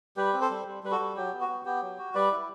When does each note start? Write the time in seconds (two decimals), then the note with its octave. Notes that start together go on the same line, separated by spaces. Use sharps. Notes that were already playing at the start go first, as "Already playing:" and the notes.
0.17 G3 G4 B4
0.33 C4
0.41 A4 C5
0.50 G3
0.66 G3
0.83 G3 B4
0.91 F#4 A4
0.99 G3
1.16 F#3 G4
1.33 B3
1.41 F#4
1.48 B3
1.65 B3 G4
1.82 F#3
1.99 F#4
2.15 G3 B4 D5
2.32 E4